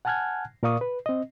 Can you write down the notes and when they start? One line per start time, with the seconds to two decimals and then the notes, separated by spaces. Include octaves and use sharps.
0.05 F#5 G#5 A5 F6 F#6 G#6
0.63 A#2 A#4 D5 F5 C#6 D#6
0.81 B4
1.06 C4 D#5